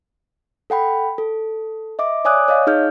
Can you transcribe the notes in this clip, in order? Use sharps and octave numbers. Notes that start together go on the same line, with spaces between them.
A4 F#5 G5 B5
A4
D#5 E5 D6
C#5 D5 G#5 D6 D#6 F#6
C#5 D#5 F5
D#4 G#4 F6 G6